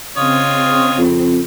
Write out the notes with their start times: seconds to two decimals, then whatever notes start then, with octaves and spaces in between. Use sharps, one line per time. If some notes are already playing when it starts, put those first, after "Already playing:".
0.17 C#3 C4 F4 C#5 D#5
0.98 F2